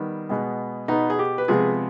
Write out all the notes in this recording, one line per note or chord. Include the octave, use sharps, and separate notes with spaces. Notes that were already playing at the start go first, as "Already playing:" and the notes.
Already playing: D#3 G3 B3
B2 G#3 B3
B2 B3 D#4
G#4
G4
B4
C3 F3 G#3 B3 G#4